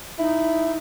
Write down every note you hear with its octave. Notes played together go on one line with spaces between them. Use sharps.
D#4 E4